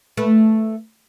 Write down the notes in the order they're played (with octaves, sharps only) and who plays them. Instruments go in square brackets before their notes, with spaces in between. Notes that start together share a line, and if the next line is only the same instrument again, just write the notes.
[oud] A3 B4